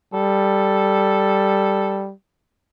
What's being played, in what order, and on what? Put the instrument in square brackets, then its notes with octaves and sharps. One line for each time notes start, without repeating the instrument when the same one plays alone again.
[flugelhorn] G3 [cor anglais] A4